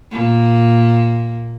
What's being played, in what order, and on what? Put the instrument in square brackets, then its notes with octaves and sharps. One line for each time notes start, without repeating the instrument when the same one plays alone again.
[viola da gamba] A#2 A#3